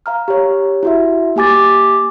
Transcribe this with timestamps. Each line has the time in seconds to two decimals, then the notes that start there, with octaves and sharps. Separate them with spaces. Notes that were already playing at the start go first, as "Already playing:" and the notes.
0.06 F5 A#5 F6
0.28 G4 C#5
0.83 E4 F#4 E5
1.36 A#3 G4 G#5 D6 A6